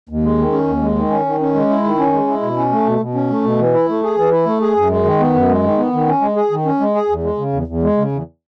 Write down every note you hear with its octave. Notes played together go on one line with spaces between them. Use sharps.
D#2
G#3
D#3
C#4
D#2
G#3
D#3
C#4
D#3
C#4
G#3
E4
D#3
C#4
G#3
E4
B2
C#4
A3
B2
B2
C#4
A3
B2
E3
E4
A3
G#4
E3
E4
A3
G#4
F#2
G#3
D#3
B3
F#2
G#3
D#3
B3
D#3
C#4
G#3
G#4
D#3
C#4
G#3
G#4
E2
G#3
C#3
E2
E2
G#3
C#3
E2